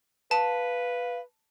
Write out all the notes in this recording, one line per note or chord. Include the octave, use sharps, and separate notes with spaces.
B4 F5 A5